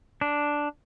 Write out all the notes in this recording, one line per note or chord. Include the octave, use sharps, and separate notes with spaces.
D4